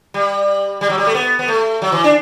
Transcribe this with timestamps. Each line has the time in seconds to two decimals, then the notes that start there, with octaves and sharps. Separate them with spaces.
0.14 G3
0.81 G3
0.90 F#3
0.98 G3
1.07 A3
1.15 B3
1.39 B3
1.48 A3
1.82 F#3
1.92 E3
2.04 D4